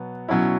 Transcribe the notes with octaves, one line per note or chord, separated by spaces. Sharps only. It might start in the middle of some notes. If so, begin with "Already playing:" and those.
Already playing: B2 F#3 B3
B2 F#3 C#4 E4